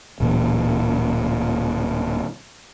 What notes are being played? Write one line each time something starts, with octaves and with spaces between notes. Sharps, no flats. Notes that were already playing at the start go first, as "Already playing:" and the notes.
D1 A#2 E3